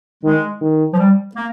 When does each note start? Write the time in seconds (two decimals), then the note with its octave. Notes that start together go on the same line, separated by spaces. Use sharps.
0.23 D#3 G#3
0.61 D#3
0.94 F3
0.98 G3
1.36 A#3